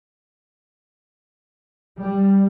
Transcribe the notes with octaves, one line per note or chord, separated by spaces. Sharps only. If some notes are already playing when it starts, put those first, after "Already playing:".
G3